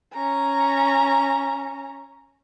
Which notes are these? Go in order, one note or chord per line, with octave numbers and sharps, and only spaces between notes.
C#4 A#5